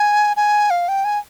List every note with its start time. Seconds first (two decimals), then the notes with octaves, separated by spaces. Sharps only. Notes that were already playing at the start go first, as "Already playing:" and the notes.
Already playing: G#5
0.37 G#5
0.70 F5
0.88 G5
1.05 G#5